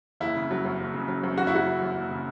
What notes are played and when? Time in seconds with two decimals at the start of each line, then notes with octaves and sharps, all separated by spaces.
0.21 F#1 E4
0.36 C#3
0.51 F#3
0.65 F#2
0.80 F#1
0.94 C#3
1.08 F#3
1.23 F#2
1.38 F#1 F#4
1.47 E4
1.52 C#3 F#4
1.66 F#3
1.82 F#2
1.96 F#1
2.10 C#3